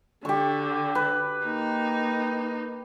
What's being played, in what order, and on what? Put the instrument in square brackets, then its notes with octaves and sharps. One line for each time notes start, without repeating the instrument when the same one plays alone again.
[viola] D3 [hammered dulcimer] G4 C#6
[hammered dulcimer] B4
[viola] A#3 D#4